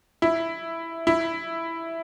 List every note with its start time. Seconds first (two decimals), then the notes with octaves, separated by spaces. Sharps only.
0.22 E4
1.07 E4